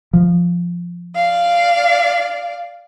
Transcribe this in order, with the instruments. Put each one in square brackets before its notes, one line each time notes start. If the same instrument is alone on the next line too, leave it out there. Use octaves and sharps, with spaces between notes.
[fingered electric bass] F3
[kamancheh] D5 F5